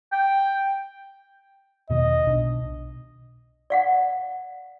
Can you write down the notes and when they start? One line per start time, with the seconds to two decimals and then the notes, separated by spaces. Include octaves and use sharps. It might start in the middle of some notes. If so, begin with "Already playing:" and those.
0.12 G5
1.90 E1 B2 D#3 D#5
2.26 B1 B2 D4
3.70 D5 F5 F#5